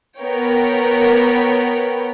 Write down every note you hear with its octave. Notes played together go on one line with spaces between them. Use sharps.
B3 A#4 C#5 G5